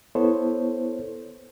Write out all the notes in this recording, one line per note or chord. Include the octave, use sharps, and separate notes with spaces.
B3 E4 A4 C5 C#5